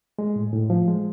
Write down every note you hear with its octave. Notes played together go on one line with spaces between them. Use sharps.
G#3
A2
A2
F3
G#3